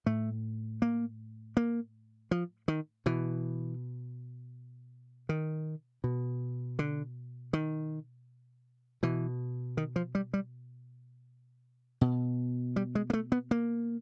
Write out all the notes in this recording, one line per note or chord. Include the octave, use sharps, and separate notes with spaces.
A2 A3
A#3
A#3
F3
D#3
B2 E3
D#3
B2
D3
D#3
B2 E3
D#3
F3
G3
G3
B2
G3
G#3
A#3
A3
B3
A#3